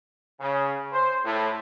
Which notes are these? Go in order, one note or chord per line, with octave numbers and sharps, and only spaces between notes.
C#3
C5
A2